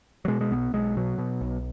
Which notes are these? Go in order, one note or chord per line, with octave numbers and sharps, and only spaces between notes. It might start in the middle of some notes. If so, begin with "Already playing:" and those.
F#3
B2 G#3
G#3
B1 B3
B1 G#3
B2 F#3
B2
B1